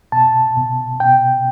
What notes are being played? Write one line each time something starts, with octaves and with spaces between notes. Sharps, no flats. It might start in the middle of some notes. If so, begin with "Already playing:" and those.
B2 A5
B2
B2 G5